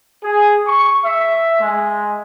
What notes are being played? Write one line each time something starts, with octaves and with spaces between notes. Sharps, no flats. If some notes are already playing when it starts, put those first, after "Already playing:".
G#4
C#6
E5
G#3